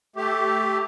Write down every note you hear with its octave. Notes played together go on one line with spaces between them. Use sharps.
A3 G4